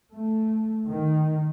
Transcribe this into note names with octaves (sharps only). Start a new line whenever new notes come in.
A3
D#3